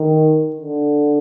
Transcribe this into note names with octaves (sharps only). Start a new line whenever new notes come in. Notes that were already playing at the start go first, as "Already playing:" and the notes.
Already playing: D#3
D3